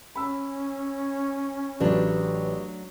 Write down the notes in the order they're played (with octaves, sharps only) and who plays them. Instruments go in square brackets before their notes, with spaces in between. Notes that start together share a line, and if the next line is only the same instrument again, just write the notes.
[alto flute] C#4 [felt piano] B5 E6
[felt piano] A1 F4 [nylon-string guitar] F#3 A3 D4 [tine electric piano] G4 B4 D5